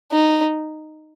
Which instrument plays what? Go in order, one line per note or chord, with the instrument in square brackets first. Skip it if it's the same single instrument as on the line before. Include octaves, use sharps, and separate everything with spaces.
[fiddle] D#4